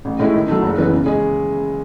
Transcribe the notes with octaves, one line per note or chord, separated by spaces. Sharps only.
A1
A2 G#3 C#4 E4
D#3
F#3 A3
F#1
F#2 E3 B3
C#3
G#3 C#4 G#4